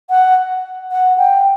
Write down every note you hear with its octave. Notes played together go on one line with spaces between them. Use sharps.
F#5
F#5
G5